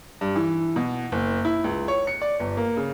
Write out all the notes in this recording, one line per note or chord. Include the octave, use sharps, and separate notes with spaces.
G2
E3
B2
F#1
E4
C#2
C#5
C#7
D5
G1
A#3
C#3